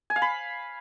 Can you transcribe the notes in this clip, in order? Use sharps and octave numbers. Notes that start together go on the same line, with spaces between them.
G#5
F5
B5